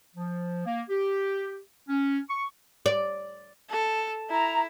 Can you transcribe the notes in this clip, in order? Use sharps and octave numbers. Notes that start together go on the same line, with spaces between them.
F3
A#3
G4
C#4
C#6
D5
A4
E4 A#5